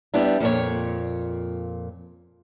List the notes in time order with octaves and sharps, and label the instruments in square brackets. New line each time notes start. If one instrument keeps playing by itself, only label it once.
[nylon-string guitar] G3 B3 D4 E4
F2 A#2 C#5